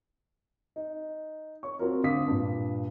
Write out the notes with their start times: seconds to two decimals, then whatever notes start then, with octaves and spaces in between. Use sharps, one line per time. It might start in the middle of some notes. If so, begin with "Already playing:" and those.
0.76 D#4
1.63 C#5 C#6
1.79 C4 F4 F#4 A#4
2.03 D2 C4 F5 D6 D#6 B6
2.28 G2 A#2